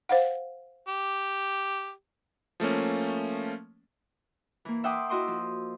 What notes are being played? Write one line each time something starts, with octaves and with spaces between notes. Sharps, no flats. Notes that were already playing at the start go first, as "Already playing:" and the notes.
C5 F5 F#5
G4
F3 A3 A#3 C#4
E3 A#3
E5 F#5 G5 C6 D6 D#6
E4 F#4 D#5 C6 D6
F3